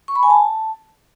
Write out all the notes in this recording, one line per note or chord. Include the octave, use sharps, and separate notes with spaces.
C#6
B5
G#5
A5